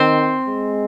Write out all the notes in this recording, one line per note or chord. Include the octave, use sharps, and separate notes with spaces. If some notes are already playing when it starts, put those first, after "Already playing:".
Already playing: D#3 C4 C5
G#3